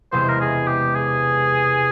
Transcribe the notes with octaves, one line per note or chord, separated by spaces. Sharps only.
E1 E2 C3 E3 G#3 C5
A#4
G#4
G4
G#4